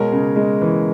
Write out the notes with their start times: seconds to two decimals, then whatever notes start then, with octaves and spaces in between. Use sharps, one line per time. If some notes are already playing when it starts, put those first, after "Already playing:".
Already playing: B2 G#3 A#4 C#5
0.12 C#3
0.36 G#3
0.61 E3